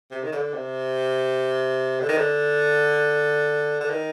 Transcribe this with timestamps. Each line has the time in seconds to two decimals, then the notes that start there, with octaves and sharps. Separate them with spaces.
0.11 C3
0.23 D#3
0.32 D3
0.53 C3
2.00 D3
2.09 D#3
2.17 D3
3.80 D3
3.90 D#3